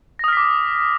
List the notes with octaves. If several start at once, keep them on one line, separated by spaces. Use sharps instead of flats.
D6 D#6 F6 A#6 B6